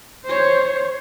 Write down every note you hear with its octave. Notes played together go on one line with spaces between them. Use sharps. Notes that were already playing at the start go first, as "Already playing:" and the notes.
C5 C#5